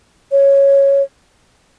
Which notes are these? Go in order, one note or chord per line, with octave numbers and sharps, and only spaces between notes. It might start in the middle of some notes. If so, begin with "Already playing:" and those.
C#5